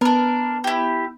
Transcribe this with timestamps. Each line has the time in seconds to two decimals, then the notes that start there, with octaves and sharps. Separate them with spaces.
0.01 B3 D4 A#4
0.64 E4 G4